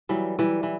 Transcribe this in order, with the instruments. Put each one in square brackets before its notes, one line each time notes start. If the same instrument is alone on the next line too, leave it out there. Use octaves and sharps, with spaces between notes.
[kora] E3 G3 [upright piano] F#3
[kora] E3 G3 [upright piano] E4
[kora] E3